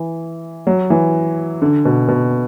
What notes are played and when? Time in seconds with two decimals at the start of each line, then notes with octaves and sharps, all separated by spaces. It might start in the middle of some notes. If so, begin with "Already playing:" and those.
Already playing: E3
0.67 F#3
0.90 E3
1.62 D3
1.85 B2
2.08 B2